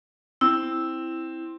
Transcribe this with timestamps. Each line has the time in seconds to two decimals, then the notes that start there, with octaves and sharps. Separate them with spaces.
0.41 C4 E4 E6